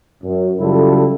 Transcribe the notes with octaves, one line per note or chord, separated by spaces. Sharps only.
F#2
C#3 F#3 G3 E4 F4 A4